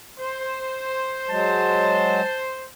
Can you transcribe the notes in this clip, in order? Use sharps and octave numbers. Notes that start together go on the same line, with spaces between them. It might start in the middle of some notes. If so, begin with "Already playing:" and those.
C5
F#3 G#3 A5